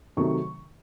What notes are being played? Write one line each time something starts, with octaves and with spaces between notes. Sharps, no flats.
C3 D#3 F#3 A3 C#6